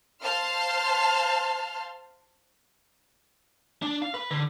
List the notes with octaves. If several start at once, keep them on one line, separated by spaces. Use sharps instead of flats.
C5 F5 A5 C6 F6
D4
F5
B4
D3